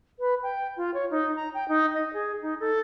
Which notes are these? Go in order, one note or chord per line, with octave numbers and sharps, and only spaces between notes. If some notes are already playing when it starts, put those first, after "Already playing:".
B4
G5
F4
C#5
D#4
A#5
G5
D#4
D#5
G#4
D#4
A4